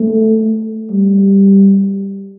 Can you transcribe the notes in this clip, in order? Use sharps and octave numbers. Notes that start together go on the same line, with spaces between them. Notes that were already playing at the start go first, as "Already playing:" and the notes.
Already playing: A3
G3